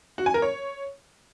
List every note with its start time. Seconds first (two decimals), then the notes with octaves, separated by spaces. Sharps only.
0.18 F#4
0.26 G#5
0.34 A#4
0.42 C#5